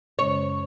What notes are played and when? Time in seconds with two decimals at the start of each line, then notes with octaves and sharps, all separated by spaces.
0.19 F#2 C#3 G#3 C#4 C#5